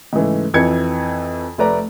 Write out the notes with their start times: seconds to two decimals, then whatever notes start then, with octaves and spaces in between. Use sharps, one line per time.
0.13 G#2 C#3 E3 A3
0.54 F2 E3 G#6 C#7
1.58 F1 A3 B4 D5 A#5